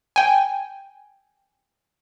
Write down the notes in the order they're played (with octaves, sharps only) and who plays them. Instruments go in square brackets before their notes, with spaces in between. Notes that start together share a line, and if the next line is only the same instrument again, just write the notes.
[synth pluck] G5 G#5